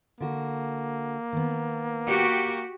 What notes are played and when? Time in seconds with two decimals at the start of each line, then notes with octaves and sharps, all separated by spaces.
0.20 D3 A#3 F#4
1.33 D#3 B3
2.07 F#4 G4